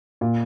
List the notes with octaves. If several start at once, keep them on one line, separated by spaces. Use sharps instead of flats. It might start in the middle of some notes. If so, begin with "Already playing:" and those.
A#2